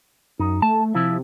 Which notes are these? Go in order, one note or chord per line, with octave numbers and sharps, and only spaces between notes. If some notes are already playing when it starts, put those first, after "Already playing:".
F#2 D#4
A3 A5
C3 F3 E4